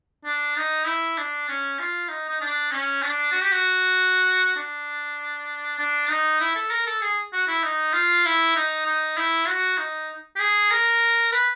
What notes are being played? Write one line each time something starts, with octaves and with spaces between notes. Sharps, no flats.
D4
D#4
E4
D4
C#4
F4
D#4
D#4
D4
C#4
D4
F#4
G4
F#4
D4
D4
D#4
E4
A4
A#4
A4
G#4
F#4
E4
D#4
F4
E4
D#4
D#4
E4
F#4
D#4
G4
G#4
A#4
B4